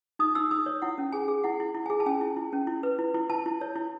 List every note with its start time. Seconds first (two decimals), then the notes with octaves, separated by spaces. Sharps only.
0.19 D#4 D#6
0.35 D#4 E6
0.51 D#4 D#6
0.66 C#5
0.82 E4 F#5
0.98 C#4
1.12 G#4 G#5
1.28 G#4
1.44 E4 F#5
1.60 E4
1.75 E4
1.86 G#4 G#5
2.00 A5
2.06 C#4 G#5
2.21 E4
2.37 E4
2.53 C#4
2.67 E4
2.83 B4
2.99 E4
3.14 E4
3.30 E4 A5
3.46 E4
3.61 C#5
3.76 E4